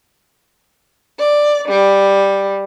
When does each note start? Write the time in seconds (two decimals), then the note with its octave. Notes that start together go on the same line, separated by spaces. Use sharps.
1.19 D5
1.68 G3